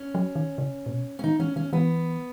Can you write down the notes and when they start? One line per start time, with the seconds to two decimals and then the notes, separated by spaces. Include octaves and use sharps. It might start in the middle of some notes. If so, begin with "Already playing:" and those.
Already playing: C#4
0.15 F#3
0.35 D#3
0.58 C#3
0.86 A#2
0.91 B2
1.19 C#4
1.24 D#3 D#4
1.39 E3 C#4
1.56 D#3 C#4
1.73 E3 B3